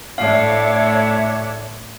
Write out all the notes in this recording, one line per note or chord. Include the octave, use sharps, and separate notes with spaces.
A2 A3 D4 C#5 E5 F5 D6